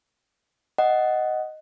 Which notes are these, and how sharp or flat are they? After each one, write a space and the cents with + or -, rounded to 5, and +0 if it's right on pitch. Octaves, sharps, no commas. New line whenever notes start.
D#5 +0 F#5 +10